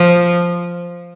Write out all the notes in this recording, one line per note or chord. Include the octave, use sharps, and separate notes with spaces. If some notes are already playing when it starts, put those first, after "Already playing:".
Already playing: F3